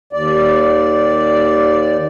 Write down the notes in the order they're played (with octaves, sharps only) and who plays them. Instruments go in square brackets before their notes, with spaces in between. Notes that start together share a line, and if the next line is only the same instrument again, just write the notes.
[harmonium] D#2 D5